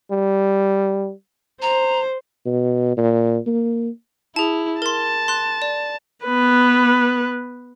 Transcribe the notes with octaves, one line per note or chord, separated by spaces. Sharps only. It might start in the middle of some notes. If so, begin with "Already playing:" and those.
G3
C5 A#5
B2
A#2
A#3
E4 G#4 A5
A#4 A5 C6
C6 F#6
D5
B3 B4